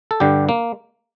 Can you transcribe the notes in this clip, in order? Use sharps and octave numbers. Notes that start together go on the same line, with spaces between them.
A4
G2 D3 G3 G4
A#3